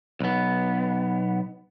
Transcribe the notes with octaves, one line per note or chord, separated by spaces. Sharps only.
B1 B3